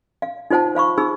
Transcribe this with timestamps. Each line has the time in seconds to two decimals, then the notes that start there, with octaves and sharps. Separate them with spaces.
0.22 F5
0.51 D#4 F4 C5 F#5 A5
0.75 C5 F5 B5 C#6
0.97 D#4 G#4 B5 E6